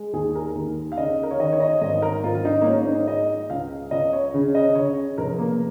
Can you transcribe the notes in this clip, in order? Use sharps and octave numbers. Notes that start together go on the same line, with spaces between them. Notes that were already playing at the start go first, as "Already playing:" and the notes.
Already playing: G#3
D#2 G#4
A#4
D#2
F5
C#3 D#5
A#4
C#5
D#3 D#5
C#5
D#5
G#1 D#5
A#4
G#1 F4
F4
D#4
A#3
G#2 C#4
D#4
G#3 D#5
C#2 F5
C#2 D#5
C#5
C#3
D#5
C#3 C#5
F1 A#4
A#3